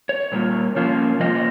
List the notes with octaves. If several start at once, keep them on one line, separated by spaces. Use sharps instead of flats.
C#5
A#2 G3 A#3 F4
C3 F3 A#3 C#4 F4
C3 F3 A#3 F4 D#5
D#5